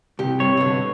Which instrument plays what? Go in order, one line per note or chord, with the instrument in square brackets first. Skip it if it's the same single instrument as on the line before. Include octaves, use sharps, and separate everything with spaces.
[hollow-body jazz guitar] C2 [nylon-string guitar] G4
[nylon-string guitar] C3 G3 [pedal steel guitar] C#5
[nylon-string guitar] B2 D3